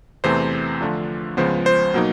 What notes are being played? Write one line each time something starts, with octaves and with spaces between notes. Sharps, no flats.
E2 C3 E3 A3 C4 C5
D3 F3 A3 D4 F4
C#2 C#3 F3 G#3 B3 C5
C5
B2 F#3 A#3 D#4